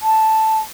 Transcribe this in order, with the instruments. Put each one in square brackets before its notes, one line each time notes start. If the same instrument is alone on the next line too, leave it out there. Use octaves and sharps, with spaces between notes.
[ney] A5